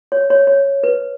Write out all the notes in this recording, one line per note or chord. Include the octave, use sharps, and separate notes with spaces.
C#5
C#5
C#5
B4